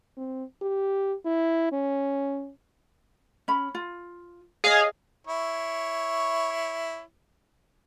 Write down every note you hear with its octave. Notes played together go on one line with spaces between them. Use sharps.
C4
G4
E4
C#4
C#4 B5
F4
G#4 C#5 D#5 F5
E4 C#5